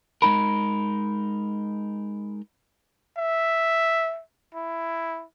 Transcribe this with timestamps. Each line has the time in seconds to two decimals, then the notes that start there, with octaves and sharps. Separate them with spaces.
0.22 G#3 D#4 A#4 B5
3.18 E5
4.55 E4